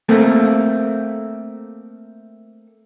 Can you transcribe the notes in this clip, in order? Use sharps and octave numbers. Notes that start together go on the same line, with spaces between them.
A3 A#3 C4